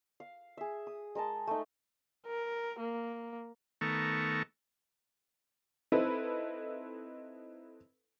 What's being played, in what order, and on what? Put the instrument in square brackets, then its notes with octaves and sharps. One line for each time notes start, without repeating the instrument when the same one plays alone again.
[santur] F5
G#4 E5
D#6
G#3 A#4 D#5 A5
A3 D#4
[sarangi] A#4
A#3
[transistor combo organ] D#3 A3 B3 A4 A#5 C#6
[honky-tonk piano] C4 D#4 E4 A4 B4